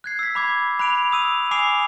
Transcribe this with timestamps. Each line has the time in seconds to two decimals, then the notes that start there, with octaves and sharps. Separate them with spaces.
0.04 F#6 G#6 C7
0.19 E6 B6
0.35 B5 D6 G#6
0.79 B5 F#6 D7 F7
1.12 D#6 E6 D#7 F7
1.51 G#5 D6 D#6 C7 D7 F7